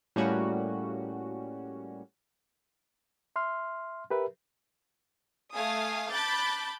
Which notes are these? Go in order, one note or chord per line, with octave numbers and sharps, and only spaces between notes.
A2 G3 A#3 C#4 F#4
E5 C6 F6
G4 A#4 B4 E5
A3 F5 G#5 D#6
A5 B5 D6 F#6 G6 A6